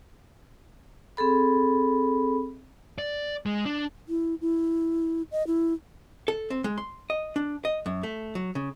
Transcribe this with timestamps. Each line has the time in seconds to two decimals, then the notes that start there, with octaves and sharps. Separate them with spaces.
1.17 C4 G#4 A4 B5
2.98 D5
3.46 G#3
3.66 D4
4.09 E4
4.41 E4
5.32 D#5
5.47 E4
6.28 A4
6.50 C4
6.64 G#3
6.78 C6
7.10 D#5
7.36 D4
7.65 D#5
7.86 F#2
8.03 A3
8.35 F#3
8.55 C#3